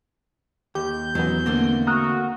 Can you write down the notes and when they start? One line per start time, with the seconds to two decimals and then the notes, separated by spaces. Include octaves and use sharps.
0.75 D#2 G4 G6
1.15 E2 D#3 F#3 B3 C#4
1.46 D3 A3 A#3 C4
1.87 F#4 A#5 D#6 F6